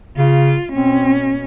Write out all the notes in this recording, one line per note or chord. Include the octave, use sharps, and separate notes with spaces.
C#3 F4
B2 C4 C#4